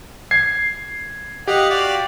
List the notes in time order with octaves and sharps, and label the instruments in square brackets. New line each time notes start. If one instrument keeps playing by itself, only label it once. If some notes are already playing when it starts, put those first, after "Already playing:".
[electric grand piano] G#6 C7
[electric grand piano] G4 [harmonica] D#5 F5 F#5
[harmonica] F#4 D5 F5